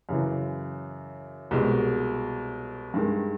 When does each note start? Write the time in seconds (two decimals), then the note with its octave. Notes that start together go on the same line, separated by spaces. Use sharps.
0.09 F#2 C#3 E3
1.51 C2 B2 G#3
2.94 G2 D#3 G#3